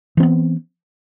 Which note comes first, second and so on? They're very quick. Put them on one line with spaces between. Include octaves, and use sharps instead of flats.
E3 C4 B3